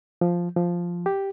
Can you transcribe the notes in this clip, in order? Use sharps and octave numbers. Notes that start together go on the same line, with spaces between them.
F3
F3
G4